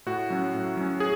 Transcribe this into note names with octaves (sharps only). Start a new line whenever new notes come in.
A2 F#4
F#3 C#4
A2
F#3 C#4
G#4